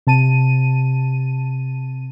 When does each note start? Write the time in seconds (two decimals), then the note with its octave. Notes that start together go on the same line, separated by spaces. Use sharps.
0.07 C3 A5 D#7